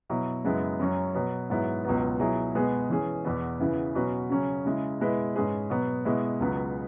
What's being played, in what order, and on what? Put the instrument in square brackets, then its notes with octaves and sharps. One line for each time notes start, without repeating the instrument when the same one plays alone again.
[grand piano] B2 F#3 E4
F#2 C#3 G#3 B3 E4
F#2 F#3 C#4
B2 F#3 B3
G#2 F#3 B3 E4
C#2 B2 F#3 B3
B2 F#3 E4 G#4
B2 G#3 B3 G#4
E3 C#4 G#4
E2 B2 B3
E2 C#3 E3 B3 E4
B2 F#3 C#4 F#4 B4
C#3 F#3 C#4
C#3 G#3 E4
B2 G#3 E4 B4
G#2 G#3 C#4 G#4 B4
B2 F#3 B3
B2 G#3 E4 B4
C#2 C#3 F#3 B3